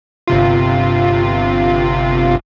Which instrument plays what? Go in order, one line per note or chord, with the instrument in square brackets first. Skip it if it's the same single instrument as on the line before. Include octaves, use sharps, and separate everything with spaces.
[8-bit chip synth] G1 C3 F4